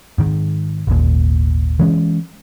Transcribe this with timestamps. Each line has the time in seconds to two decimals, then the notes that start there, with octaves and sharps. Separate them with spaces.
0.18 G#2 D#3
0.87 G#1 D#2 A#2
1.79 E3 G#3 C#4